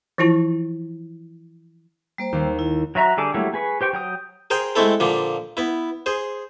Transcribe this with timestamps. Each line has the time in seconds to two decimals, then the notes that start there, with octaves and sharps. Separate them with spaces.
0.18 E3 F3 E4 F4 A5
2.18 G3 A#3 C5
2.33 D#2
2.59 E4
2.95 F#3 F#4 E5 A#5
3.17 D3 G3 G#4 A4 D6
3.34 F#3 G3 A3 A#3 E4
3.54 G#4 B4 C#6
3.81 G4 C5 G5 C#6
3.93 F#3 G5 D#6
4.50 G#4 A#4 C5 G5
4.76 G#3 A3 C4 E4 A4
5.00 A#2 D3 F3
5.57 B3 E4
6.06 G#4 C5